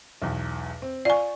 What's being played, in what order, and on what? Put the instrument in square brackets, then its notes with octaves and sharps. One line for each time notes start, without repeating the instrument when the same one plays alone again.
[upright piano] B1 E2
C4
[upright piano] F4 C#6 [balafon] D5 G#5